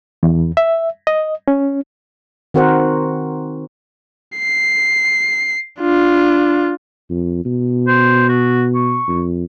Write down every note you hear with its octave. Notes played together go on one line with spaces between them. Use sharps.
E2
E5
D#5
C#4
D#3 C4 F#4 A#4 C5 F#5
C7
D4 F4
F2
B2
C5
F#4
C#6
F2